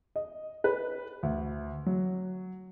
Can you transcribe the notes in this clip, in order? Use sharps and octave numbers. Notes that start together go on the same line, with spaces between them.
D#5
B4
D2
F#3